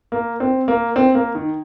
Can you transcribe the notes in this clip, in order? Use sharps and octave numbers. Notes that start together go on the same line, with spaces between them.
A#3
C4
A#3
C4
A#3
D#3